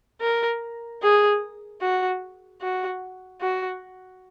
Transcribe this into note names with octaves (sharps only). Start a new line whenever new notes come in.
A#4
G#4
F#4
F#4
F#4